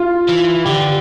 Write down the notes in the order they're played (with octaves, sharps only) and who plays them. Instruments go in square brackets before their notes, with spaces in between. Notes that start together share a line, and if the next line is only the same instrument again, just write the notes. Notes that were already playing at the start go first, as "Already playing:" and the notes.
Already playing: [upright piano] F4
[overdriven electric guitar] E3
[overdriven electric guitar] D3 [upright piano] G4